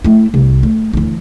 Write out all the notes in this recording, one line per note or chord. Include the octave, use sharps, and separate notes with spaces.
A3 E4
C2
A3
D2 E3